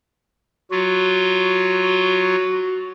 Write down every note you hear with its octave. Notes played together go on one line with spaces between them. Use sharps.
F#3 F4 F#4